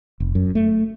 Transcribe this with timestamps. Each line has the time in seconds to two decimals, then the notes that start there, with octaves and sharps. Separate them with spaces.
0.20 F1
0.35 F#2
0.55 A3